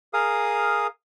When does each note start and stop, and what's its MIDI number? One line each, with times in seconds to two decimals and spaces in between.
0.14 0.87 68
0.14 0.87 70
0.14 0.87 77
0.14 0.87 87